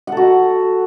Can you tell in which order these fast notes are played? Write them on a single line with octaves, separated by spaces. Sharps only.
F#5 A4 F#4